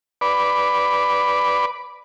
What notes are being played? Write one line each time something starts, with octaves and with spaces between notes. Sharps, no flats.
B4 D5